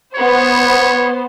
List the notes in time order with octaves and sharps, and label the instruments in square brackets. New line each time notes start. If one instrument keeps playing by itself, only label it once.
[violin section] B3 C5 [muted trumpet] C#5